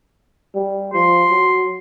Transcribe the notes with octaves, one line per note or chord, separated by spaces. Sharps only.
G3
F3 C6
F#3